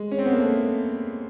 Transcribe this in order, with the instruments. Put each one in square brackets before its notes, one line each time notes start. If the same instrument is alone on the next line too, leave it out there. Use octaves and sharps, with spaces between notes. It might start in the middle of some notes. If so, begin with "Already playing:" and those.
Already playing: [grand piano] G#3
C#4
C4
B3
A#3
A3